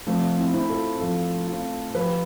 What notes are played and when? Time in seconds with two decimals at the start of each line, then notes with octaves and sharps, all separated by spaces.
0.07 F3 A3 C4
0.38 C4 E4
0.54 C4 E4
0.70 F4 A4
1.00 F3 F4 A4
1.48 C4 F4
1.95 F3 G4 B4